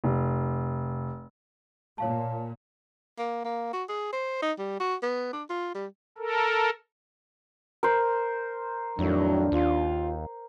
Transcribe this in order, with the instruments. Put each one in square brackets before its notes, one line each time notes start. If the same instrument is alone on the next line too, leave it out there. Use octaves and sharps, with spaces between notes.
[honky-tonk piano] F1
[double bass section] A#2 [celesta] C#5 F5 A5
[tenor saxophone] A#3
A#3
F#4
G#4
C5
D#4
G3
F#4
B3
D4
F4
G3
[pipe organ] A4 A#4
[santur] A#4 C5
[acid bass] F2 [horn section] A2 D#3 F#3 [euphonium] D4
[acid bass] D#2 [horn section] F4